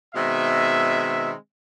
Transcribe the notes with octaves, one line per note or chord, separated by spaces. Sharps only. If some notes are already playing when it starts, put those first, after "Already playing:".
B2 D#3 G#3 C4 E5